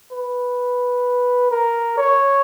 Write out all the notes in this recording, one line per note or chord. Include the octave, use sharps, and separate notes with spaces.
B4
A#4
C#5